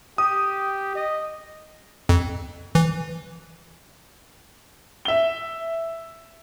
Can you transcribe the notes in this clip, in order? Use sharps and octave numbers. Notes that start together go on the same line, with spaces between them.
G4 D#6
D#5
F2
E3
E5 G7